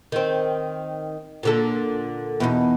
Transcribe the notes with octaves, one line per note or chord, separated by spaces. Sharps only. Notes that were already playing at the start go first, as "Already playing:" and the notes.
D#3 C4
A#2 D3 A4
E2 B2 D#4